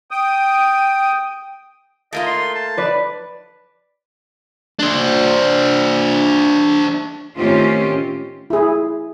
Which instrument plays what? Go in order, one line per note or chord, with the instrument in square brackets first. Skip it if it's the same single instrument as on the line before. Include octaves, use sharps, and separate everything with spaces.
[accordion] G5 D#6
[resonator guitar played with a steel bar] A3 A#3 F4 [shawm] D#5
[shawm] C6
A5
[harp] B4 D5
[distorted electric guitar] D4 C5
[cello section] A2 D#3 C4 C#4 F4 G4
[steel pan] E4 G#4